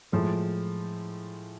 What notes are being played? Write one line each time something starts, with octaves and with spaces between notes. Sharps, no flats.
A2 F3 G#3